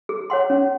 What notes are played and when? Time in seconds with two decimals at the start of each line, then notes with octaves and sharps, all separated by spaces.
0.09 G#4
0.30 C#5 F#5 C6
0.50 C#4